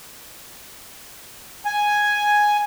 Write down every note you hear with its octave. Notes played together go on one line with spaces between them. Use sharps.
G#5